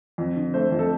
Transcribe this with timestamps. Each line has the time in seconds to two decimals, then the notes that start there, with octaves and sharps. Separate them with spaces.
0.18 F2
0.36 D3
0.54 A3 C5
0.72 F2
0.79 A4